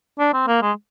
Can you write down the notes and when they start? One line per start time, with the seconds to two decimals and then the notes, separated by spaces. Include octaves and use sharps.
0.19 D4
0.33 C4
0.48 A#3
0.62 G#3